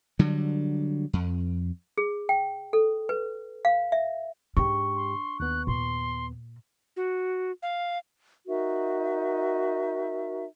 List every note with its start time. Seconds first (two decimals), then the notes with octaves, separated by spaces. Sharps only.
0.19 D3 F#3 G3
1.13 F2
1.98 G#4
2.29 G5
2.73 A4
3.09 B4
3.65 F5
3.92 E5
4.57 G#2 G#3 D4 G4 C#6
4.96 C6
5.40 D#2 B3 F#6
5.67 A#2 C6
6.97 F#4
7.63 F5
8.47 D#4 F#4 A#4 E5